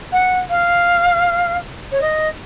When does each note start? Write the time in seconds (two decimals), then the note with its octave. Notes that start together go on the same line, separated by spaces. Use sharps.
0.12 F#5
0.49 F5
1.92 C#5
2.01 D#5